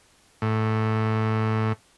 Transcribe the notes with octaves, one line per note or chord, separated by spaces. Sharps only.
A2